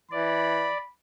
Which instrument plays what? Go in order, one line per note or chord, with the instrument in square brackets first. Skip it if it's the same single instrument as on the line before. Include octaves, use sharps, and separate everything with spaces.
[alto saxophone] E3 [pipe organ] D5 [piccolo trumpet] B5